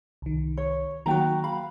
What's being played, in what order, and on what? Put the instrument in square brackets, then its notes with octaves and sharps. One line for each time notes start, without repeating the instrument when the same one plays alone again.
[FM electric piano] C2 D#3
[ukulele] C#5
[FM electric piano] D#3 F#3 A#3 [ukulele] F#4 G5 A#5
[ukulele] F5 B5